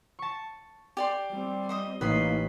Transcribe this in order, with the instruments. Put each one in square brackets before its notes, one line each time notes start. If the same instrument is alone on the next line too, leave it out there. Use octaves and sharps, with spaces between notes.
[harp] A5 C#6
[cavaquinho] G4 D5 C6
[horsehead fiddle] G3 C4
[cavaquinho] C5 D#5 D#6
[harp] A1 C7 [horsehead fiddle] A#3 D#4 [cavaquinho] B4 D#5